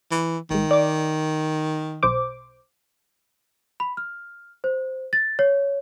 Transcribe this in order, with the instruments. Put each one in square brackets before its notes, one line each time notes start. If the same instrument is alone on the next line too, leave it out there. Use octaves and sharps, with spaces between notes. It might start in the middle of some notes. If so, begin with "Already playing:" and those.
[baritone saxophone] E3
[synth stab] A#1 G#2 [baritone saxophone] D#3
[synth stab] D5 D6
B1 C5 D6
[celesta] B5
F6
C5
A6
C#5